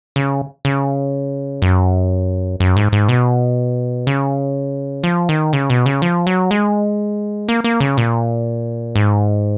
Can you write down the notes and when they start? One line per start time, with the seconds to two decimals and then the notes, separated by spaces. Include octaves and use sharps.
0.16 C#3
0.65 C#3
1.62 F#2
2.60 F#2
2.76 G#2
2.92 G#2
3.09 B2
4.07 C#3
5.04 F3
5.29 D#3
5.53 C#3
5.70 B2
5.86 C#3
6.02 F3
6.27 F#3
6.51 G#3
7.49 A#3
7.64 A#3
7.80 C#3
7.97 A#2
8.95 G#2